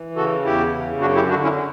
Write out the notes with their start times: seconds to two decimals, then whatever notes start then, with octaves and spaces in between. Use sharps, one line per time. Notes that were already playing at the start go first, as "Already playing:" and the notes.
Already playing: E3
0.16 C#3 F#4 A4
0.45 E2 E4 G4
0.73 C#3
1.01 F#2 D4 F#4
1.15 E4 G4
1.30 D3 D4 F#4
1.43 C#4 E4